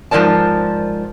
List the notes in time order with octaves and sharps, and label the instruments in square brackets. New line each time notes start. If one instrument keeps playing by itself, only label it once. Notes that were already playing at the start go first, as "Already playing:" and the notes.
[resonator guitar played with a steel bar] G#2 F3 G3 A#4 D5 A5